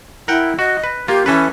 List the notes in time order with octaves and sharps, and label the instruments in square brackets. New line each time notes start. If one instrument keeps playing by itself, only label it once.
[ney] E4 [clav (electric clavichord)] A#4 F#5 G5
[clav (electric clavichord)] F#4 [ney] D#5
[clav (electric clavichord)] B4
[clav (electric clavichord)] A#3 F4 [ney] G4
[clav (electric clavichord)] E3 A4 B4 [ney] C#4